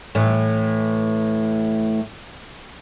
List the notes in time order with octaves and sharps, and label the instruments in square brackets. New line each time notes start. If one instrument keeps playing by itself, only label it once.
[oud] A2 E3